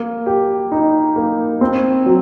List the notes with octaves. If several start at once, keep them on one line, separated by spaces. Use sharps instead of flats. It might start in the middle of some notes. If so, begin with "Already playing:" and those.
Already playing: A#3
G4
D#4
A#3
C4
F#3